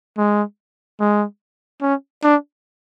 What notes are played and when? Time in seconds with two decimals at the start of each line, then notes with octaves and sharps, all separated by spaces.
0.17 G#3
1.00 G#3
1.82 C#4
2.23 D4